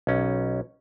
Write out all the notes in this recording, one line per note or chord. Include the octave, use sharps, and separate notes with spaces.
B1 C#4